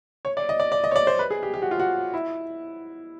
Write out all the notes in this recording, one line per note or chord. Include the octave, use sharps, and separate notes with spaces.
C#5
D5
D#5
D5
D5
D#5
C#5
D5
C5
B4
G#4
G4
G4
F#4
F4
F#4
E4